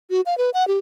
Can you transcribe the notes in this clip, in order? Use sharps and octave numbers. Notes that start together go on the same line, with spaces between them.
F#4
F5
B4
F#5
G4